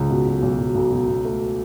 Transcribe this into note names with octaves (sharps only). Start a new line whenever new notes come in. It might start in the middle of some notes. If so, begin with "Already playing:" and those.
Already playing: C#2
B2
B1
B1
B1
B1
B2
B2
A3